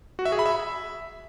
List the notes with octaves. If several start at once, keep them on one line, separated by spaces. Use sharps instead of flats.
F#4
E5
G#4
B5
E5